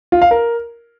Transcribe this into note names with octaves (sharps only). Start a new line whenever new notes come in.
F4
F5
A#4